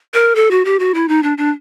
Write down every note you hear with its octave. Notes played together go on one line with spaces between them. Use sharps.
A#4
A4
F#4
G4
F#4
E4
D#4
D4
D4